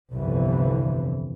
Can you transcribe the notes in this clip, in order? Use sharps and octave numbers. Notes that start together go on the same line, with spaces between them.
G1 C2 F2 D3 E3